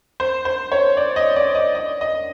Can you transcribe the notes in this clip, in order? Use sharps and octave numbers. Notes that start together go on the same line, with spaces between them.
C5
C5
C#5
D5
D#5
D5
D#5
D#5
D#5